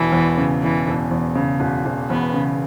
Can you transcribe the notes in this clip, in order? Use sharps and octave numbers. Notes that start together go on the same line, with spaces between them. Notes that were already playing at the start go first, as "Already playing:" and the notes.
Already playing: E1 E3
E2
C#3
E1 E3
E1
E2
C#3
E1
E1
E2 B3
C#3